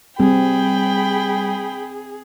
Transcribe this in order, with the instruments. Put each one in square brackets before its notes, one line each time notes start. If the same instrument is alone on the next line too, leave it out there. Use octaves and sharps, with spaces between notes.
[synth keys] G3 [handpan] C4 [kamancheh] G#4 [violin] G5 B5